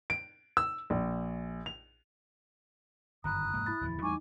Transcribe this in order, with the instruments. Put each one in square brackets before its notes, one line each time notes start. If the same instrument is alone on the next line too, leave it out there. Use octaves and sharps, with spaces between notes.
[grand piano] D7
E6
A#1
F7
[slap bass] G1 F#2 D#3 [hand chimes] A#5 B5 [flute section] D#6 F#6
[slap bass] F1 G#2 A#3
[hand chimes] E4 B5 A6
[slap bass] D1 E2 F3
[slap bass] E2 G3 A3 [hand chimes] D#4 [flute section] G#5 C#6 D6